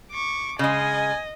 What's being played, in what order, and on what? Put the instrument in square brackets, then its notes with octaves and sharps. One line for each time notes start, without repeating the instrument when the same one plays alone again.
[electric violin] C#6 D6
[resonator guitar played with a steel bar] C#3 G#3 [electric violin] D#5 [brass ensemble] G#5